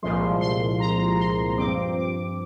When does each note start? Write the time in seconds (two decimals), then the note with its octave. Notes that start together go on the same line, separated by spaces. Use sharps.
0.02 C2 A#2 F3 G#3 C6
0.41 C6
0.80 A#5
1.19 C6
1.58 G2 F3 C4 D6
1.98 D6